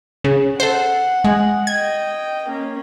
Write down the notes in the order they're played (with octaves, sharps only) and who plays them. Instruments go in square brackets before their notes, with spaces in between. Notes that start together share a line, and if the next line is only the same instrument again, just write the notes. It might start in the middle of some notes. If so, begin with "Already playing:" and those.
[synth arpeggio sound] C#3
[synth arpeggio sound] A4 C5 [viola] F#5
[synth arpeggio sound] G#3
[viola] D#5 G5 [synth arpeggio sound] G#6
[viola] A#3 C#4